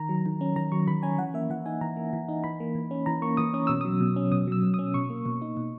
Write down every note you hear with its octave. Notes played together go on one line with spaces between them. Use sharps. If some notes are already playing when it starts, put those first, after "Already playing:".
Already playing: D#3 A#5
F#3
D#3
C#4
D#3 A#5
F#3 C#6
D#3 B5
C#4 G#5
E3 F#5
A#3 E5
E3 F#5
D#4 G#5
E3 A#5
A#3
E3
D#4
E3 B5
A#3
E3
C#4
E3 A#5
A#3 C#6
E3 D#6
C#4 D#6
B2 E6
F#3 D#6
B2
C#4
B2 D#6
F#3 E6
B2
D#6
C#4
B2 C#6
A#3
B2
D#4
B2